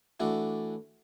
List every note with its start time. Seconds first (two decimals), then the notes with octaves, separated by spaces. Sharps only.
0.20 E3 A3 D4 F#4